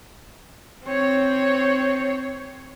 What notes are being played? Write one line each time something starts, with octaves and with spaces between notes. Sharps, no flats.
C4 C#5